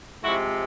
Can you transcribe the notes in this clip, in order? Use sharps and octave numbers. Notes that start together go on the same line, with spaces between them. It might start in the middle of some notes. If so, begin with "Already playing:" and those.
C3 F3 G#3 E4 F#4